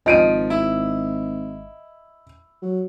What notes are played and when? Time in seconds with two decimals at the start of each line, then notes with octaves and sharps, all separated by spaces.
0.06 G#1 F3 D#5 D7 D#7
0.50 E4
2.62 F#3